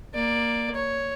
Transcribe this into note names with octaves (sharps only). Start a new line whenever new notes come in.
A#3 D5
C#5